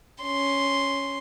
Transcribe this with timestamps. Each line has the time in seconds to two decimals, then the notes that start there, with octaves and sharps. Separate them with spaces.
0.22 C#4 C6